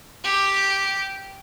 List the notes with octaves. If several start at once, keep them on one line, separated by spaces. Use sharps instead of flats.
G4